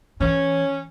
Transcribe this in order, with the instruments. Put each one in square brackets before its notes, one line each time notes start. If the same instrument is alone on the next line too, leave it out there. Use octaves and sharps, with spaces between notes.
[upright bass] E3 [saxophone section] C#4